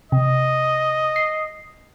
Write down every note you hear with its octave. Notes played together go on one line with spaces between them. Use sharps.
C3 D#5
C7